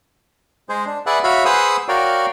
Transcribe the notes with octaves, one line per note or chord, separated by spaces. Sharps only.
G#3 G#4 C5
D4
G#4 B4 D5 E5 F#5
F#4 C#5 E5 F5 B5
G#4 B4 C5 F#5 D#6 E6
F#4 A#4 C#5 D5 F5 G5